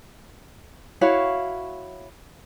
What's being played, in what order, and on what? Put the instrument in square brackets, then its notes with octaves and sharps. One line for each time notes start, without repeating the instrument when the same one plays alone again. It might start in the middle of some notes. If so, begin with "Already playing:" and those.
[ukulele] E4 F#4 C#5 F5